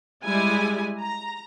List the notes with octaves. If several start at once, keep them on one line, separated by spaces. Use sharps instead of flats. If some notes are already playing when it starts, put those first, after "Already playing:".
G3 G#3 E4 G#5
A#5